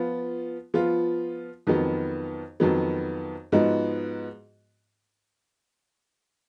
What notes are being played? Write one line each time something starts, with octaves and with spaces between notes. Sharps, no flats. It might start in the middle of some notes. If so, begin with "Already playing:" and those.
Already playing: F3 B3 F4
F3 B3 F4
F2 D#3 F#3 B3
F2 D#3 F#3 B3
G#2 F3 B3 D#4 F#4